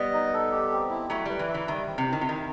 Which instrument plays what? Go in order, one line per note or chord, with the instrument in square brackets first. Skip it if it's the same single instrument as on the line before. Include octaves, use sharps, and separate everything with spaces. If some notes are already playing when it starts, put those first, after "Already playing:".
Already playing: [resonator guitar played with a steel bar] G3 B3 [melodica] D#5
[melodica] D#4
A4
G4
C4
E4
[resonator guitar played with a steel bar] F#3 A3 [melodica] E4
[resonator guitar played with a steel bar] G3 [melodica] B4
[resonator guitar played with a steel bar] E3
[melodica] E5
[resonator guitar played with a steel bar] E3
[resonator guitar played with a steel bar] D#3 [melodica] G3
[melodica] C4
[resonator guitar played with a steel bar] C3
[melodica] E4
[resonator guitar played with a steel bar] D#3
C3
[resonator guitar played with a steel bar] D#3 [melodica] D#4